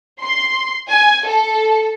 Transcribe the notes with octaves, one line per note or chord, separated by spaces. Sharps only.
C6
G#5
A4